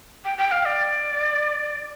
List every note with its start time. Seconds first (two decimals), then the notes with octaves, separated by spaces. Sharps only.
0.25 G5
0.38 G5
0.51 F5
0.65 D5